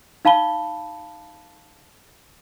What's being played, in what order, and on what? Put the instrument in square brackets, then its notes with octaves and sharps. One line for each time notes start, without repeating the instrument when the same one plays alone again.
[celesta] D#4 F5 A5 B5 G7